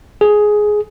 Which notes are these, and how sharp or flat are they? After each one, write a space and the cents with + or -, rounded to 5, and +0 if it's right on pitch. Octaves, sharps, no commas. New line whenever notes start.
G#4 +10